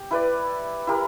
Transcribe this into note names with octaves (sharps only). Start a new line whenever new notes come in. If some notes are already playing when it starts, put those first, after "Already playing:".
Already playing: G4
E4 B4 D5
E4 G4 A#4